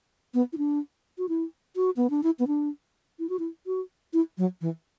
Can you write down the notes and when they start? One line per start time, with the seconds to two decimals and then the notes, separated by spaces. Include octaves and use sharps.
0.34 B3
0.53 E4
0.58 D4
1.18 F#4
1.29 E4
1.76 F#4
1.97 B3
2.10 D4
2.23 E4
2.39 B3
2.47 D4
3.19 E4
3.29 F#4
3.39 E4
3.66 F#4
4.13 E4
4.38 F#3
4.61 E3